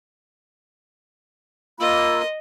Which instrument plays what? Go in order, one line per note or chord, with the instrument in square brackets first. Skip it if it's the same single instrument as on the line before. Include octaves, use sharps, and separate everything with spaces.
[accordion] A#3 F4 [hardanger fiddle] D#5 [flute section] B5 E6